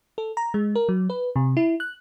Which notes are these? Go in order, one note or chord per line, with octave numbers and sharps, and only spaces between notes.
A4
A#5
G#3
A#4
F#3
B4
C3
E4
F#6